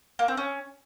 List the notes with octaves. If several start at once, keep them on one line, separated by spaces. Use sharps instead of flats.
A#3
C4
C#4